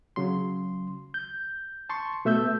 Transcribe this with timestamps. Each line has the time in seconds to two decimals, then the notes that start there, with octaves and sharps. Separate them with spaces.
0.16 C#3 F#3 C6
1.14 G6
1.89 A5 C6 C#6
2.25 B2 A3 E5 E6 G6